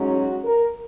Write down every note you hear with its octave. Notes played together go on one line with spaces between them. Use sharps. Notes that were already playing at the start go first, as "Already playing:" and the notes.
Already playing: G#2 F#3 C#4
F#4
A#4